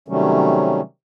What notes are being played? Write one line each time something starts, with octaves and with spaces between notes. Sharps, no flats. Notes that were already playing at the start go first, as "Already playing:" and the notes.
C3 D#3 F#3 G3 A3 C#4